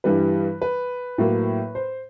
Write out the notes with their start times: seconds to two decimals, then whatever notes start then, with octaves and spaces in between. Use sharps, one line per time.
0.04 G2 E3 G3 B4
0.62 B4
1.18 A2 F#3 A#3
1.75 C5